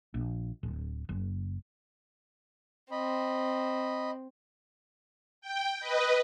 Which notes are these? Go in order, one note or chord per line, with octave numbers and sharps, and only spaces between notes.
A#1
D1
F#1
C4 D#5 B5
G5
B4 D#5